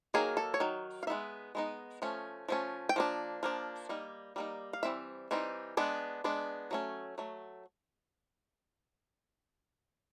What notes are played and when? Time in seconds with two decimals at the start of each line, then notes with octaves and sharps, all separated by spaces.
0.14 D#3 F#3 A#3 G#4
0.37 A4
0.54 C#5
0.60 D#3 F#3
1.03 F5
1.07 G#3 B3 D#4 E5
1.55 G#3 B3 D#4
2.02 F3 A3 C#4
2.49 F3 A3 C#4
2.89 G5
2.96 F3 A#3 D4
3.43 F3 A#3 D4
3.89 G3 A#3 D#4
4.36 G3 A#3 D#4
4.73 F5
4.83 E3 G3 C4 E5
5.31 E3 G3 C4 D#4
5.77 G#3 B3 D4
6.24 G#3 B3 D4
6.71 F#3 A3 C#4
7.18 F#3 A3